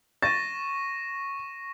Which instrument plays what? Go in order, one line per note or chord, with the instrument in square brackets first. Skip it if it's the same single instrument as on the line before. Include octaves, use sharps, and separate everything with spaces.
[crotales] C#6 A#6 D#7 [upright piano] A6